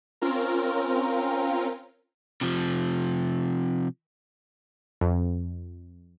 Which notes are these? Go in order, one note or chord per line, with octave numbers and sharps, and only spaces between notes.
C4 C#4 F4 A#4
C3 F3
F2